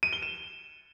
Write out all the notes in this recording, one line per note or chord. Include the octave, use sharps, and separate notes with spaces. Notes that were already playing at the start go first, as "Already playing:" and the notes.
D#7
G7
E7